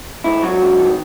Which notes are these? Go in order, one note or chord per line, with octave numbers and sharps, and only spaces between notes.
G#2 E4
F#3 F#4
G#2
D#3